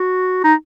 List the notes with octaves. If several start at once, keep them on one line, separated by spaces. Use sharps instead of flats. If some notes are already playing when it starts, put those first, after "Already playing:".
Already playing: F#4
D#4